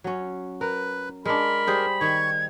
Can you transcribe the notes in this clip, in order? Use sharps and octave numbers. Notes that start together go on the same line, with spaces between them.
F#3 C#4
A#4 B4
G#3 D4 A#4 B5
G3 G#4 C5
D#3 C#6 G#6